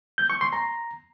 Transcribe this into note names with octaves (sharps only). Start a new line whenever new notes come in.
G6
C#6
C6
A#5